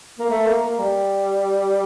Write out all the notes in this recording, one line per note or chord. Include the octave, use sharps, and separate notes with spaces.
A#3
A3
A#3
A#3
G3